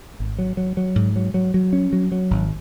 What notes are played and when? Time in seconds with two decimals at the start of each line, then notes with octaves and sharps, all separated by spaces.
0.20 G#1
0.38 F#3
0.57 F#3
0.77 F#3
0.96 G#2
1.16 F#3
1.34 F#3
1.54 F#3
1.73 C#4
1.93 F#3
2.12 F#3
2.31 G#1